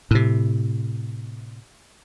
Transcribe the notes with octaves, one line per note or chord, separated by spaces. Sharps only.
A2 C3